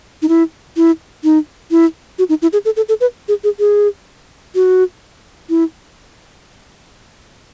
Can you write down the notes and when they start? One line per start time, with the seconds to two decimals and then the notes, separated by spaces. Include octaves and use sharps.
0.22 D#4
0.29 E4
0.77 E4
1.24 D#4
1.71 E4
2.19 F#4
2.29 D#4
2.42 E4
2.53 G#4
2.65 A4
2.76 A4
2.89 A4
3.01 B4
3.28 G#4
3.44 G#4
3.59 G#4
4.55 F#4
5.50 E4